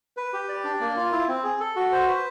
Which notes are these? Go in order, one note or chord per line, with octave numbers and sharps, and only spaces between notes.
B4
G4
D5
D4
A#3
F4
E4
C4
G#4
A4
F#4
C5
B4